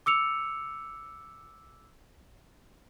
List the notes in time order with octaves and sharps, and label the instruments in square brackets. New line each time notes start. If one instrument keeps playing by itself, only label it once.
[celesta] D6 E6 C#7 F7